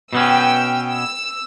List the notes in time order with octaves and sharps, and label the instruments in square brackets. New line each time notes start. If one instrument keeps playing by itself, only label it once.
[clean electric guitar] B2 B3 C#4 [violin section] G5 E6
[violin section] E6